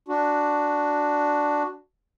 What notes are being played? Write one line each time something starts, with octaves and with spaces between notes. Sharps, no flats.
D4 F#4